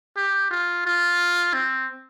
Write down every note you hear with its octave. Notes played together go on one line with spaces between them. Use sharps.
G4
F4
F4
C4